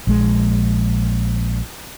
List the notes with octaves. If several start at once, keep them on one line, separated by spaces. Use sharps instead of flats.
A#1 G#3